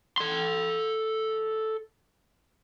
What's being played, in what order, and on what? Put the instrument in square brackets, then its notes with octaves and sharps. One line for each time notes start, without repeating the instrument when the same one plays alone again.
[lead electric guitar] A4 C6